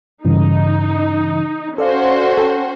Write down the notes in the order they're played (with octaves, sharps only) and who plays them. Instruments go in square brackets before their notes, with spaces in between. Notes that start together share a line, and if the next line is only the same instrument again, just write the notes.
[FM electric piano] G2 C#3 E3 [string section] D#4
[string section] C#4 F#4 C5 [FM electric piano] A4 D5 F5
[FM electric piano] A4 G5